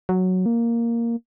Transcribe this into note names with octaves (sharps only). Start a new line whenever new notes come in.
F#3
A#3